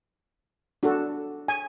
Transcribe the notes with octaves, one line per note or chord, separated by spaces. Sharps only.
D4 F#4 A4
G#5